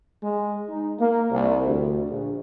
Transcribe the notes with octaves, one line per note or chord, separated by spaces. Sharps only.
G#3
D#4
A#3
C2
D2
A#1